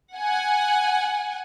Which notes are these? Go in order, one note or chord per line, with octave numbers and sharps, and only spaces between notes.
F#5 G#5